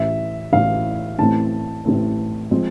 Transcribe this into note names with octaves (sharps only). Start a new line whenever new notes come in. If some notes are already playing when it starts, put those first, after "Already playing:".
Already playing: A1 A2 E3 E5
A1 A2 E3 F5
A1 A2 E3 A3 C4 A5
A1 A2 E3 A3 C4
F3 G#3 C4